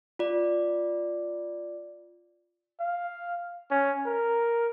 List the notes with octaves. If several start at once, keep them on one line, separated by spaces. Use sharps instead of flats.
F4 D5
F5
C#4
A#4